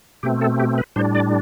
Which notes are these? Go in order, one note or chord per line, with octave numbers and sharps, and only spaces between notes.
B2 A3 C4 G4
A4
G4
B4
A2 G3 D4 C5
D5